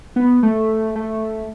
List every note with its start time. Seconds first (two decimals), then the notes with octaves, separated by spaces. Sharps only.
0.16 B3
0.43 A3
0.96 A3